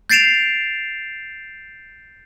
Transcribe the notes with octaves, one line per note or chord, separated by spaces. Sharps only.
G6 A6 C7 D7 E7 F7